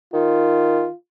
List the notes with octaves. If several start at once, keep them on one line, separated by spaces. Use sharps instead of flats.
D#3 F4